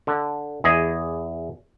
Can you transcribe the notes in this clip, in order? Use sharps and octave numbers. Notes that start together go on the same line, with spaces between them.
D3
E2 G#4 D#5